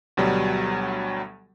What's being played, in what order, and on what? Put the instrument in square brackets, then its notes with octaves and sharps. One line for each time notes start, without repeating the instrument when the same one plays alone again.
[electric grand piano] D2 B2 F#3 G3